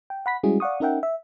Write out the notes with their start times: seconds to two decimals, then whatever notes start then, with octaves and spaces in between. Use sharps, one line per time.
0.10 G5
0.26 F#5 B5 B6
0.43 G3 G#3 C#4 E4 F#4 G#4
0.60 D5 F5 F#5 C#6 D#6
0.80 C#4 D#4 A#4 E5 F#5 G5
1.03 E5